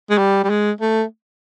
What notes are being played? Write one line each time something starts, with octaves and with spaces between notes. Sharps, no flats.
G#3
G3
G3
G#3
A3